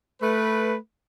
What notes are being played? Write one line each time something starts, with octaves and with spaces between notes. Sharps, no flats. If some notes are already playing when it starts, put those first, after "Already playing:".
A3 B4